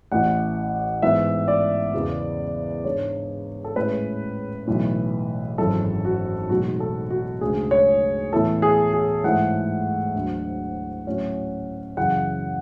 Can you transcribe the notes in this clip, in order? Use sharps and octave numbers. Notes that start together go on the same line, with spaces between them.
A1 A2 E3 F#5
G#2 E3 B3 E5
D5
E2 C#3 E3 B3
G#2 G#3 D4 C#5
A4
A2 G#3 C#4 E4 B4
B1 A2 E3
G#1 F#2 E3 G#3 A4
F#4
B1 A2 E3 G#3 B3 F#4
A4
F#4
D2 C#3 G#3 G#4
C#5
A2 E3 B3 E4 A4
G#4
G#4
G#2 E3 A3 E4 F#5
D2 D3 F#3
A2 F#3 C#4 E4
F#2 C#3 E3 F#5